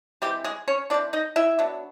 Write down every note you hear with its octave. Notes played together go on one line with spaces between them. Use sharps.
E3 G3 G#3 C4 G4
G#3 G#4
C#4 C#5
E3 G#3 C4 D4 D5
D#4 D#5
E4 E5
F#3 B3 D4